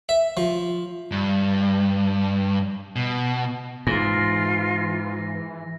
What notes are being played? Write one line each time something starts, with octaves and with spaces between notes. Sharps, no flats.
E5
F3
G2
B2
G#2 E3 F4 A#6